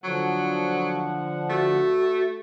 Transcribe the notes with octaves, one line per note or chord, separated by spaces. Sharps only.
D3 F3 F#3 F#5
A3 F#4